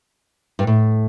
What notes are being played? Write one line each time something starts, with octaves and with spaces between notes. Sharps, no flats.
G2
A2